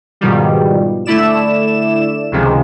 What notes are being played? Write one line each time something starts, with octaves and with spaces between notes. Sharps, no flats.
G#2 B2 D#3 F3 G3
D3 A3 E4 D5 E7
C#2 C3 D#3 F3 G#3